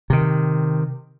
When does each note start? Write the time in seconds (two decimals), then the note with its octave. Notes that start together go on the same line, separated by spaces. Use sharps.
0.10 C3 D#3